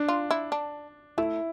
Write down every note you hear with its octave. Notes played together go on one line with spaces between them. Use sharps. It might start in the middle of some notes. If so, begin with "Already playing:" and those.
Already playing: D4
F4
E4
D4
A3 E4